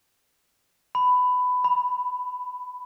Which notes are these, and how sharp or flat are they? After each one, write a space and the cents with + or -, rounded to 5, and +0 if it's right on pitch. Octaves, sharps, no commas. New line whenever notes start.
B5 +15
B5 -10